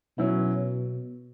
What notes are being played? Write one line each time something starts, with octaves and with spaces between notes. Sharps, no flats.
B2 F#3 C#4 E4